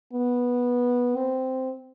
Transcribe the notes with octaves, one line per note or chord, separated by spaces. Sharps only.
B3
C4